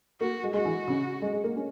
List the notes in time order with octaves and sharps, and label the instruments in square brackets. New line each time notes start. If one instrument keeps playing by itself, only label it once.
[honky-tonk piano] A#3 [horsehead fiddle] F#4
[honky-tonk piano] G#3
[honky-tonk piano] G#3 [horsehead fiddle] F#4
[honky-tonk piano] E3
C#3
G#3
G#3
A#3
C#4